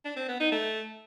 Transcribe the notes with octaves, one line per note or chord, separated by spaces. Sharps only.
D4
C4
B3
D#4
A3